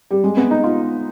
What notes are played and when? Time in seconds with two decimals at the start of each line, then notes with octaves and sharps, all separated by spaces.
0.11 G3
0.24 G#3
0.37 B3
0.51 D#4
0.64 F4